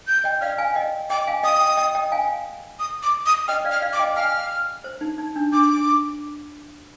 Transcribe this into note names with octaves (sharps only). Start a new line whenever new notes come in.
G6
D#5 G5
D5 F5 F6
F5 G#5
D#5 G5
D#5 G5 D6
F5 G#5
D#5 G5 D#6
D#5 G5
D#5 G5
D#5 G5
F5 G#5
D#6
D6
D#6
D#5 G5 F6
D5 F5
F6
D5 F5
D6
D#5 G5
F5 G#5 F6
C5
D#4
D#4
D4
D4 D6